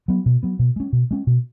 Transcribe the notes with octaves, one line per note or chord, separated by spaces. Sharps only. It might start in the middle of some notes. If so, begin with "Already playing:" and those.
F#3 B3
B2
F#3 B3
B2
G#3 C#4
B2
G#3 C#4
B2